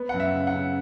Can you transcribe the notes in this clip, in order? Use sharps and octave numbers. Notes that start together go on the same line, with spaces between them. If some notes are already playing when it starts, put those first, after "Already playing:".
Already playing: B3
F#2 F#5
E5
C#3
F#5
C#3